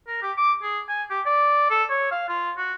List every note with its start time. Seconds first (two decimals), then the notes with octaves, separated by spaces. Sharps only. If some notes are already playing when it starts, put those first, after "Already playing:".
0.07 A#4
0.22 G4
0.37 D6
0.62 G#4
0.88 G#5
1.10 G4
1.26 D5
1.70 A4
1.90 C#5
2.11 F5
2.28 F4
2.57 F#4